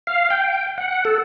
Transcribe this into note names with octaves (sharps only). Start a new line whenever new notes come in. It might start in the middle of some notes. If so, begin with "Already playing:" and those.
F5
G5
F#5
A4